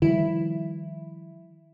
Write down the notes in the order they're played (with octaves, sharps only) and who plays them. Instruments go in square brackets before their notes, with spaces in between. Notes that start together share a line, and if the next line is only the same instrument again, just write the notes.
[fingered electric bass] D#3 F3 G3 [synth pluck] E4